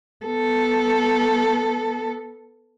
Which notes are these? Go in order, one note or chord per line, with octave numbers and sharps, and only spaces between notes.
B3 A4